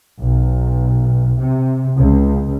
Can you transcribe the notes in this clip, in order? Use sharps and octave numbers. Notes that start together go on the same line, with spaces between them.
B1
C3
C#2